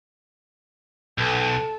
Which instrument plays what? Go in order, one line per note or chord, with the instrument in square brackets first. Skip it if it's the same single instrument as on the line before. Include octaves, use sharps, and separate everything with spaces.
[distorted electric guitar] B1 [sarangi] A4